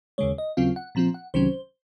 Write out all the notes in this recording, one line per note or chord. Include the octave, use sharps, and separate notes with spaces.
D#2 C#3 G#3 C#5
D#5
D#2 C#3 F#3 C4 F4 F5
F#5
A#2 F3 C4 F4 A#5
F#5
C2 C3 D#3 F#3 C#4 C5